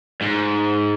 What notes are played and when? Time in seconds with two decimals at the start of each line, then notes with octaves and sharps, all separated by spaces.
0.22 G#2